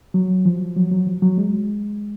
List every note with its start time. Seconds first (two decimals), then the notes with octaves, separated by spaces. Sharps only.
0.14 F#3
0.45 F3
0.76 F#3
0.91 F#3
1.07 F3
1.22 F#3
1.38 G#3